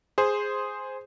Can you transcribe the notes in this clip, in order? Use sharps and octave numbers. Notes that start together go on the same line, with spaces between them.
G#4 C5